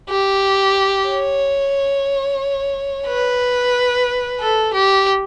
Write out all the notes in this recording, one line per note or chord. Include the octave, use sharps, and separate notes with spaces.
G4
C#5
B4
A4
G4